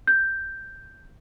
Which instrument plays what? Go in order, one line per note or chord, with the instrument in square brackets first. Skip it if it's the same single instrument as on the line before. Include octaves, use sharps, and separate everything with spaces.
[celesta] G6